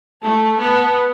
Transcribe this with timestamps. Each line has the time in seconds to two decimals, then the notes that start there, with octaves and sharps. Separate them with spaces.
0.22 A3 A5
0.59 B3 A5